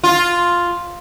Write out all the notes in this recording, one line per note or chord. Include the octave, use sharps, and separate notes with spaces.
F4